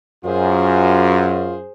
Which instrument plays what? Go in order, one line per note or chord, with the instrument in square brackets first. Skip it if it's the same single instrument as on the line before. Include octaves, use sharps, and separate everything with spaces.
[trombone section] F#2 [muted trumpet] F4 [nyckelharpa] G#4 C5